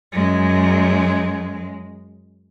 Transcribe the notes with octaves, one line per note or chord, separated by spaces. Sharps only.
F#2 G#3